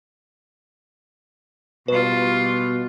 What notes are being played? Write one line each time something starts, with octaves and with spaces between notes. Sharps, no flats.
B2 G3 F4 B4